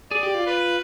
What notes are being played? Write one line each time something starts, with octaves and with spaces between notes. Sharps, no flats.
G#4 D5
G4
F4
B4